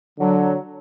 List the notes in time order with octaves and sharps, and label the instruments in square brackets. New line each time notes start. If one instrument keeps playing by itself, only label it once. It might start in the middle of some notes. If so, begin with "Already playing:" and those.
[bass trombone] D3 [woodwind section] F#3